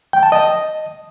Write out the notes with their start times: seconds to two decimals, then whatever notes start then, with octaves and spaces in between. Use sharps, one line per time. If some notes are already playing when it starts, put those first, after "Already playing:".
0.13 G5
0.23 A5
0.32 D#5